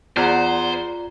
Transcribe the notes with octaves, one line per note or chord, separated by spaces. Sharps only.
E2 F4 C5 D5 F#5 A#5 F6